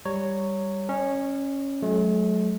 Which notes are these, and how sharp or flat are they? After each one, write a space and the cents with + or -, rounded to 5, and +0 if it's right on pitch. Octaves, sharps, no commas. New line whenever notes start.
G3 +0 C#5 +0 A#5 -20
C#4 -10 D5 +40
F#3 +0 A3 -40